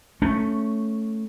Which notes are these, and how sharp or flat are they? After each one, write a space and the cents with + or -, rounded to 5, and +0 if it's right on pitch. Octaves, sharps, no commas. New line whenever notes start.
A3 +0 C#4 +0